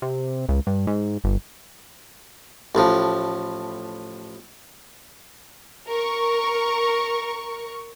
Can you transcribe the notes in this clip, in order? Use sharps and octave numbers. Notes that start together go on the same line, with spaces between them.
C3
C#2
G2
G#2
G1
A1 A2 F3
A#4 C#6